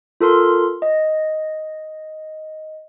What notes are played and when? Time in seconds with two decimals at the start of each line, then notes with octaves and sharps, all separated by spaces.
0.21 F4 A4 A#4 C6
0.82 D#5